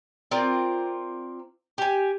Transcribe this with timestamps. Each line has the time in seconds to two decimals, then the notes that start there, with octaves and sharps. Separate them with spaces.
0.31 C4 F4 A#4 D5
1.78 G4 G#5